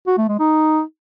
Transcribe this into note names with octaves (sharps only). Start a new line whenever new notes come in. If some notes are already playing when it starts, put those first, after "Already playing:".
F#4
A3
G#3
D#4